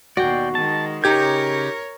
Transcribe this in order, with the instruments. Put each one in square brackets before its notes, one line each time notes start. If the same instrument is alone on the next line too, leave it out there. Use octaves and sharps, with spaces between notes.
[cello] D#2 B2 [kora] F#4 [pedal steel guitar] D5 G5
[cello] D#3 G#3 [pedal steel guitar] A5
[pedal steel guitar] C#3 G6 [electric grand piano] D#4 G4 G#6 [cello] A#4 C#5